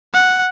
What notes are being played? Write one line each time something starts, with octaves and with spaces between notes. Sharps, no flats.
F#5